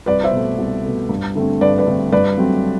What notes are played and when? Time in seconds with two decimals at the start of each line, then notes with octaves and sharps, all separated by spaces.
0.06 C2 B4 D5
0.24 C5 E5
0.32 B2 A3
0.58 C2
0.84 B2 A3
1.09 G2
1.35 D3 A3 C4
1.61 G2 B4 D5
1.78 B4 D5
1.87 D3 A3 C4
2.12 G2 B4 D5
2.38 F#3 A3 C4